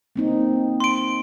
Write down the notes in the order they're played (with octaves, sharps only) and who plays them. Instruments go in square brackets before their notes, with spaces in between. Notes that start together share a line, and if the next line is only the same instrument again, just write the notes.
[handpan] A#3 C4 D#4
[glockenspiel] C6 D7